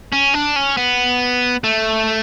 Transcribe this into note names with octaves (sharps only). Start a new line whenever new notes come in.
C#4
D4
C#4
B3
A3